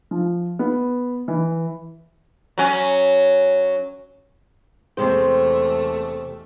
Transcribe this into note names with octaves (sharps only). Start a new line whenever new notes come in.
F3
B3
E3
F#3 C#4
E2 C3 G#3 A3 C5